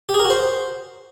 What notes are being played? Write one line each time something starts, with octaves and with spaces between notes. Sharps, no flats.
G4
G#4
A#4
F#4
C5